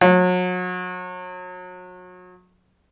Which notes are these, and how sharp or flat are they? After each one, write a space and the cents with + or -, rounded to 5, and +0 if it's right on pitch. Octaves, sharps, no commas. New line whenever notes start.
F#3 -35